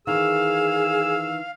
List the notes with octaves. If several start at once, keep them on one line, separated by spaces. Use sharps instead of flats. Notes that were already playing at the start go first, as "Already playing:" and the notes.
D#3 E3 G#4 F5 E6